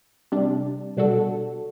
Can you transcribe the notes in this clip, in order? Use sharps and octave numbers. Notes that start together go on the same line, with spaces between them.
C3 G3 D4
B2 G3 D4 F#4 A4